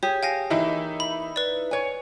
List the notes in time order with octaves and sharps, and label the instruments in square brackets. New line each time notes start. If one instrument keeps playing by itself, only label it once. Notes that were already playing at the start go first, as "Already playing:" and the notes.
[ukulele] G4 G#4 [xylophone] C#5
[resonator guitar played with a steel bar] F5 [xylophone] G5 G#5 A#6
[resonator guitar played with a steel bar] E3 A#3 [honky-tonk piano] D#4 E4
[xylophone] B5
B4 D5
[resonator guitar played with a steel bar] C#5 G#5